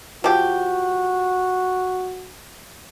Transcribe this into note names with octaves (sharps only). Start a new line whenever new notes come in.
F3 F#4 G4